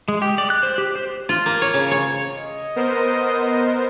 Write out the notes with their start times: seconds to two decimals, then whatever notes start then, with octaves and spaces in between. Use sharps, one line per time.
0.08 G#3
0.22 G4
0.38 D5
0.50 F#6
0.63 C5
0.78 G4
0.95 C5
1.29 F4
1.46 A#3
1.62 C#5
1.74 C#3
1.91 C#5
2.36 D#5
2.76 B3 A#4 C5